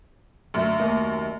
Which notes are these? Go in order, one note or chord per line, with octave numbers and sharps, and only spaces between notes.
F#2 D3 A3 E5
D#2 A3 D#5